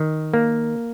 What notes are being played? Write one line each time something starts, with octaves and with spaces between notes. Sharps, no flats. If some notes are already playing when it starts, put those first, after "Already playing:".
Already playing: D#3
A#3